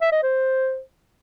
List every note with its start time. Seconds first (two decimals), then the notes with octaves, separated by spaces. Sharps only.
0.02 E5
0.12 D#5
0.23 C5